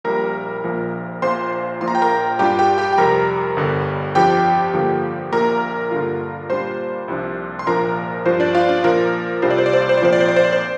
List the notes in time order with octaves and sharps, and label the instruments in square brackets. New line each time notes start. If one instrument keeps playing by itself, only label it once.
[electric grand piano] A#1 A#2 G3 A#4 A#5
A#1 A#2 F3 A#3
A#1 A#2 A#3 D4 F4 C5 C6
A#1 A#2 F3 A#3 F4 C6
A#5
G5
A#4 A#5
G2 G3 D4 F4 G4 G5
G4 G5
G4 G5
G5
F2 C3 G3 A#4 A#5
G1 G2 D3 G3
F2 F3 D4 G4 G5
G2 D3 F3 A#3
A#1 A#2 A#3 A#4 A#5
G2 D3 A#3 D4 F4
A#2 G3 A#3 D4 F4 C5 C6
C2 C3 F3 D4
C6
A#1 A#2 F3 A#3 D4 A#4 A#5
G2 F3 D4 F4 C5
D4 D5
F4 F5
D4 D5
A#2 F3 A#3 A#4
C2 C3 G3 D4 F4 C5
D5
C5
D5
C5
D5
C5
D5
A#1 A#2 F3 C4 C5
D5
C5
D5
C5
D5
C5